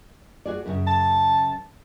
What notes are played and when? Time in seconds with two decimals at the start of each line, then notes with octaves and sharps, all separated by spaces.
0.45 F#4 G#4 D5
0.66 F#2 A#2 C#3
0.87 A5